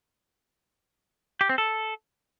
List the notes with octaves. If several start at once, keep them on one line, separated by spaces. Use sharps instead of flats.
G4
C4
A4